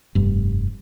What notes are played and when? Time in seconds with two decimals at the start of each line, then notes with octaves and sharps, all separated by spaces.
0.15 F1 G2